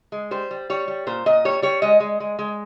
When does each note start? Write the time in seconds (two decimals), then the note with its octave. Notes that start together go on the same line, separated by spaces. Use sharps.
0.12 G#3
0.31 G3 C5
0.51 G3
0.70 G3 C#5
0.88 G3
1.07 A#2 C5
1.26 A#2 D#5
1.45 G3 C#5
1.62 G3 C#5
1.82 G#3 D#5
2.00 G#3
2.20 G#3
2.39 G#3